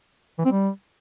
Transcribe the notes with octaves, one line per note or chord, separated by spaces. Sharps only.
E3
C4
G3